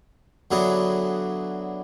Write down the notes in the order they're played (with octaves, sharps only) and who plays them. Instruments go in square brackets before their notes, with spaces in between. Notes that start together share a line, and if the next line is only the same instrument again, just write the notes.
[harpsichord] D3 F#3 B3 E4 G#4